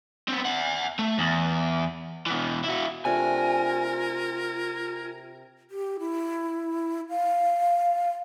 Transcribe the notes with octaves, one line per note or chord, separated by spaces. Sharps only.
B3 C4
E5 F#5
A3
E2
B2 E3
E4 F#4
C3 A3 D4 F4 A#4 G#5
G4
E4
F5